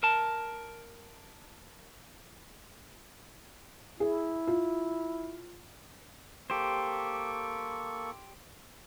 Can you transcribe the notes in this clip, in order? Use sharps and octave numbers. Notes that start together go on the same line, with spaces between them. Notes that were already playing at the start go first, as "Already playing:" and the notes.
A#4 A5
E4 G#4
F4
A#3 G4 A4 C5 C#6